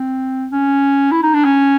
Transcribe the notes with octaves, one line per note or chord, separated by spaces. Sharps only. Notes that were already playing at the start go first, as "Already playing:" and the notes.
Already playing: C4
C#4
E4
D#4
D4
C#4